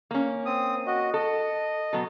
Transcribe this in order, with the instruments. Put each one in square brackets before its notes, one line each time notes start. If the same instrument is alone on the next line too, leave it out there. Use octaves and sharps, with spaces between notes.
[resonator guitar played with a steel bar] A#3 C#4
[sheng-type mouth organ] C4 D#6
F#4 D#5
[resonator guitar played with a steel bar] A4 [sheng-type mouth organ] D#5
[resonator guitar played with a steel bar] B2 F#3 A4